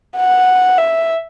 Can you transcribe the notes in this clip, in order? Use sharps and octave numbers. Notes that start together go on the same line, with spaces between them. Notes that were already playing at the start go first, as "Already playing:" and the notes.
F#5
E5